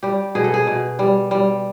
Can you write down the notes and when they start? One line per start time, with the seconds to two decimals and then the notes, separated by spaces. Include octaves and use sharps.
0.03 G3 G4
0.35 B2 G#4
0.44 A4
0.54 G#4
0.67 B2
0.99 G3
1.31 G3